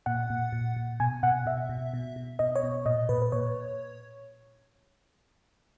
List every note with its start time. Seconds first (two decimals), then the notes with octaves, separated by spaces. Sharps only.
0.06 A#2 F#5
0.30 A#2
0.52 A#2
0.76 A#2
1.00 B2 G#5
1.23 B2 F#5
1.46 B2 E5
1.69 B2
1.94 B2
2.16 B2
2.39 B2 D#5
2.55 C#5
2.63 B2
2.86 A#2 D#5
3.09 A#2 B4
3.22 B4
3.32 A#2 C#5